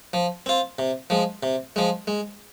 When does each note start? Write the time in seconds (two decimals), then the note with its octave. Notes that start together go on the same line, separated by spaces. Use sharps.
0.13 F3
0.46 C4 F4
0.79 C3
1.10 F3 G#3
1.43 C3
1.76 F3 G#3
2.07 G#3